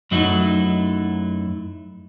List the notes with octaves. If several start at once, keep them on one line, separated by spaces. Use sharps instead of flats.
F#2 F#3 A3 D#4 E4